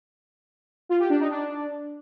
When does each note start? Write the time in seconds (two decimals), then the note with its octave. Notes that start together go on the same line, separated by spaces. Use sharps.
0.89 F4
1.00 G4
1.10 D4
1.20 D#4
1.30 D4